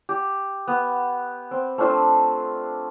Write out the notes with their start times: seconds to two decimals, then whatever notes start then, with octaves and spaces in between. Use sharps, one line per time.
0.09 G4
0.68 B3
1.51 C4
1.78 A3 C4 D4 F4